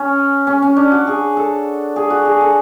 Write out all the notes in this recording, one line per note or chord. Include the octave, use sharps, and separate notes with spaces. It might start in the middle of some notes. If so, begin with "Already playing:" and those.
Already playing: C#4
C#4
C#4
D4
F#4
G#4
A4
G#4
F#4
G#4
A4